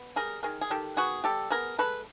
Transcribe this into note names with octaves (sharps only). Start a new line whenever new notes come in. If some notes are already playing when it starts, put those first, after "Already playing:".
Already playing: B3
G3 G#4 A#4
D#3 G#4 A#4
G#4
D#3 G4 A4
B3 F#4 G#4
G3 G4 A4
B3 G#4 A#4
G#3 A4 B4